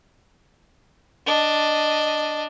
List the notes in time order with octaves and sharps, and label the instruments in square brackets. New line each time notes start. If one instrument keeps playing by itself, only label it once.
[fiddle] D4 D#5